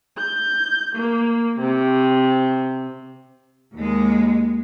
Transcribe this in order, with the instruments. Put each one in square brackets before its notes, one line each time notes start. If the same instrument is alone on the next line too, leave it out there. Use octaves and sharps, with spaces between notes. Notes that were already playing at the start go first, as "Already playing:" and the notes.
[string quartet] G6
A#3
C3
[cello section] D#2 G#3